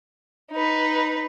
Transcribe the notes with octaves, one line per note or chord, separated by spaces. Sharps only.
D#4 B4